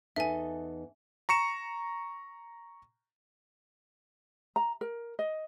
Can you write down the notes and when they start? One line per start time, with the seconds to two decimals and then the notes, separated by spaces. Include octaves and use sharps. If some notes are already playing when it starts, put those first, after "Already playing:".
0.16 E2 D#4 A4 E5 G#5
1.29 A#5 C#6 C#7 E7
4.56 A#5
4.81 A#4
5.19 D#5